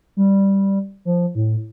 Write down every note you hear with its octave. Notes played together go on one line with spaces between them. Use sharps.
G3
F3
A2